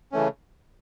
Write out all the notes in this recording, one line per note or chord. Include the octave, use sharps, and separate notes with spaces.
C#3 E3 A3 C#4